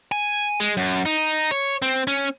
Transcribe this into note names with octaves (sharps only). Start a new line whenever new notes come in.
G#5
G#3
F#2
D#4
C#5
C4
C#4